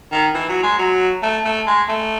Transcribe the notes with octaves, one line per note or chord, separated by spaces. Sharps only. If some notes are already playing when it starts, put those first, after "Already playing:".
D#3
E3
F#3
G#3
F#3
A3
A3
G#3
A3